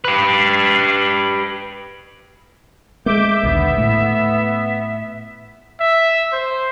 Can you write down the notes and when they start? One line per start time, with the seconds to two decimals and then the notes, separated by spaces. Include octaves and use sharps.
0.05 G4 B4
3.06 G#3 A#3 E5 D6 G6
3.43 A#1 D#2 D3 B3
3.78 A2 A3
5.81 E5
6.33 C5